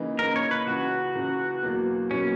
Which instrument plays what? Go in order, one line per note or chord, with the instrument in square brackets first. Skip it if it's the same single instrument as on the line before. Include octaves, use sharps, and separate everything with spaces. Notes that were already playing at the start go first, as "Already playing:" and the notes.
Already playing: [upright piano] C#3 E3 A#3 D#4
[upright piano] C#3 E3 A#3 D#4 [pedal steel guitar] A#4
[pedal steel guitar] C#5
B4
[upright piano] C#2 C#3 E3 [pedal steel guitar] F#4
[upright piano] C#2 C#3 E3
E2 B2 F#3 A#3
[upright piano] B2 F#3 A#3 [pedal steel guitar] C#4